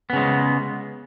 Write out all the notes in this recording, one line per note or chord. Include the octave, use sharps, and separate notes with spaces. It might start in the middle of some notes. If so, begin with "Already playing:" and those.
C#3 G#3 B3